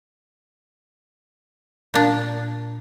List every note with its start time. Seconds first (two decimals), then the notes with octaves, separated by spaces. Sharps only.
1.94 A#2 D4